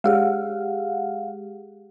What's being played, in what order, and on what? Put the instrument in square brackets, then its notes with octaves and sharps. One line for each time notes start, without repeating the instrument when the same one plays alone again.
[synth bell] G#3 G4 G#4 [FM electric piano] F5 F#5